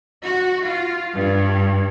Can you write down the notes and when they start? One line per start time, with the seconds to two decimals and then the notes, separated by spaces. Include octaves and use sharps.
0.25 F#4
0.65 F4
1.14 G2